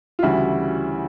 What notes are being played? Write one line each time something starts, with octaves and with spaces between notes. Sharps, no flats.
F4
D2 C#3 E3 G3 E4 F#4